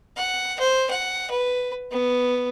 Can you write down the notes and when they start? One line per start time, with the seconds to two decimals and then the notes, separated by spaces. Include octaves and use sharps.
0.17 F#5
0.60 C5
0.90 F#5
1.31 B4
1.91 B3